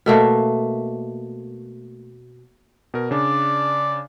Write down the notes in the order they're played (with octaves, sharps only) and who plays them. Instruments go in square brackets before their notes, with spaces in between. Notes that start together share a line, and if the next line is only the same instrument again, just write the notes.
[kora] B2 A3 A#3
[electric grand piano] B2 A#4
[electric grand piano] C#3 D4 [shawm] D5